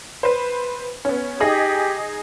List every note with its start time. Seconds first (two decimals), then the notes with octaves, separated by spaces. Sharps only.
0.23 B4 C5
1.05 B3 C#4
1.40 D#4 G4 G#4 D#5